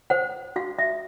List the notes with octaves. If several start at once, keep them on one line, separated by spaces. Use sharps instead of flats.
C5 F#5
F#4 F5
E5